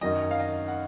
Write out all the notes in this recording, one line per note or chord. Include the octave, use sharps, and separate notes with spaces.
F#2 D#3 F#3 D#5
F5
D#5
F#5